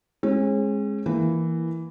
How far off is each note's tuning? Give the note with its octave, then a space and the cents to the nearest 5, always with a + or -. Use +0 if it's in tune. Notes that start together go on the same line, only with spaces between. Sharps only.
G#3 +0 C#4 -40
E3 +0 A#3 +0